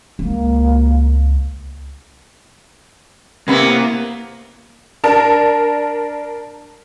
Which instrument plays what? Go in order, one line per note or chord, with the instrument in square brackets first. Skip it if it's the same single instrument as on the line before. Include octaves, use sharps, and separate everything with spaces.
[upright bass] C#2 [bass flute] A#3
[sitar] C3 B3 E4 [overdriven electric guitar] A#3
[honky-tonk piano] D4 A#4 A5